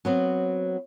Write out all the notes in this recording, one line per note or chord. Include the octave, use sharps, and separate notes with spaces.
F#3 B3 C4